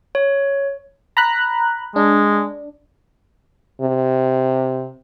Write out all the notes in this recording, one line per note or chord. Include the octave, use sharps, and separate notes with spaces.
C#5
A#5 B5 F#6
G#3 D4
C3